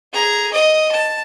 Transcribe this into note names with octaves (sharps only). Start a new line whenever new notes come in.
G#4 A#5
D#5 D#6
A5